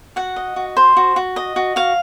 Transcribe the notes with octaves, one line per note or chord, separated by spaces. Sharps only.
F#4 F#5
D#5
F#4
C5
F#4
F#4
D#5
F#4
F#4 F5